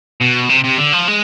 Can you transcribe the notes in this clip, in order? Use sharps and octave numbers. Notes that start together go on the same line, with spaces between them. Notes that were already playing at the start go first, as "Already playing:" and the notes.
B2
C3
C3
D3
F3
G#3